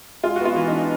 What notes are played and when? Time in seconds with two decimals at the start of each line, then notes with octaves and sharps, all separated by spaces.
0.24 G#3 F4
0.36 F#4
0.41 B3 F4
0.56 E3
0.67 D4 D#4